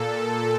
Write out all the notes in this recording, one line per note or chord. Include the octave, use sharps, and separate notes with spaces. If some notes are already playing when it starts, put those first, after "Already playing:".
Already playing: A#2 A4